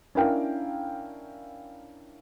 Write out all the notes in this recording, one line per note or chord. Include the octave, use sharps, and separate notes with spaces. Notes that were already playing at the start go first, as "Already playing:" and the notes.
C#4 D4 E4 A#4 F5 G5